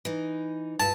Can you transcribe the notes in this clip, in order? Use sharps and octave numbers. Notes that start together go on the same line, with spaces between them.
E3 D#4
G2 F4 A5